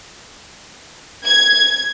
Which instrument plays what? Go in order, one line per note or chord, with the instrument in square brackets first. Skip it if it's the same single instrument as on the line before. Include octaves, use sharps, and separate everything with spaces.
[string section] G#6